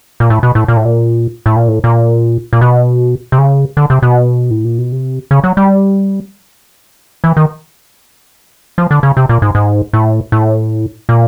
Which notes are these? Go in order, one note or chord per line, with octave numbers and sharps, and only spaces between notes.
A#2
A2
B2
A2
A#2
A2
A#2
A2
A#2
A2
A#2
A#2
B2
C3
C#3
D3
C3
B2
A2
A#2
B2
C3
C#3
F#3
G3
E3
D#3
F3
D3
C#3
C3
A#2
G#2
G#2
A2
A2
A#2